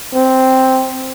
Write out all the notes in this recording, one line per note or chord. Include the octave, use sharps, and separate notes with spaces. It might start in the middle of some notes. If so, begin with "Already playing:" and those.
C4